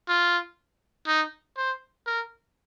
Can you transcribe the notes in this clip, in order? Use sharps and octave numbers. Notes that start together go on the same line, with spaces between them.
F4
D#4
C5
A#4